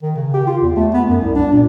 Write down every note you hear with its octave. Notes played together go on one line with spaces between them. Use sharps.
D#3
C#3
G4
F4
E2
A3
B3
F#2
C2
D4
A#2